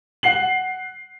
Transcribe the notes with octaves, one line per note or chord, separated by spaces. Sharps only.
F#5 C7 F#7